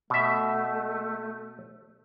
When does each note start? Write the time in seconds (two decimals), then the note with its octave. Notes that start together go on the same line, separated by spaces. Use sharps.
0.10 B2 A3 E5